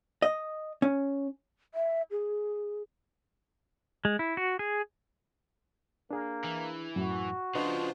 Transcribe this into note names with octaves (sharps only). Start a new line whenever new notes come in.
D#5
C#4
E5
G#4
G#3
E4
F#4
G#4
A#3 D4 G#4
E3
F#2 A2 F#4
C#3 F3 D4 F4 B4 C5 D#5 C6